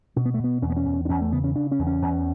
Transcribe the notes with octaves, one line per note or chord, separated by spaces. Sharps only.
B2 C#4
B3
A3
B2 B3
E2 C#4
B3
C#4
E2
D4
E2 C#4
A3
C#3 B3
C#4
C#3 D4
C#4
E2
C#4
E2